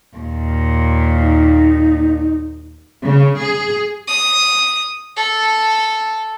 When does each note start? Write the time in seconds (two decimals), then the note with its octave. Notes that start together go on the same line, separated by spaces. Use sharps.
0.17 D#2 A#2
1.21 D#4
3.03 C#3
3.39 G#4
4.08 D#6
5.17 A4